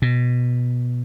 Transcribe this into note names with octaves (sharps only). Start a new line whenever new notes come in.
B2